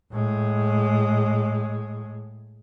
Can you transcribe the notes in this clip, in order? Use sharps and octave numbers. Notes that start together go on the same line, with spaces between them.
A2 G#3